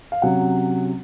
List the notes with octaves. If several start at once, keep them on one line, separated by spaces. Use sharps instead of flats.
F5
C3 F#3 C#4 F#5